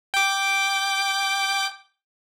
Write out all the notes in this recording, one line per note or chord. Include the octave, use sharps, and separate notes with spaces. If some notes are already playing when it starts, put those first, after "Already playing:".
G5 D6